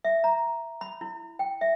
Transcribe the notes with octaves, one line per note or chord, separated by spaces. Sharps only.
E5
A#5
B5
E4
G5
E5